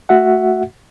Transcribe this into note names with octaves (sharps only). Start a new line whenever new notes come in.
A3 F#4 E5 F#5